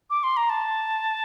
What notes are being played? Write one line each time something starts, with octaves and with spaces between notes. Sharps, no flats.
D6
C6
A#5
A5